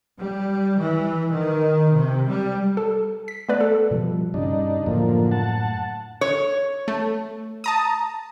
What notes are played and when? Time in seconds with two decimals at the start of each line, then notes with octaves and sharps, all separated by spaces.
0.17 G3
0.78 E3
1.30 D#3
1.92 C3
2.26 G3
2.77 A4
3.28 B6
3.49 A3 B3 B4 D5
3.61 A4
3.91 B2 F3 G3
4.34 G2 C#3 D4 D#4
4.86 F#2 A2 D3 F3 A#3
5.31 F#5 A5
6.21 C#5
6.88 A3
7.64 A5 A#5 D#6